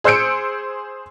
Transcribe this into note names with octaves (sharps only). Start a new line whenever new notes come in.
G#4 C5 E6 G6 C#7 D7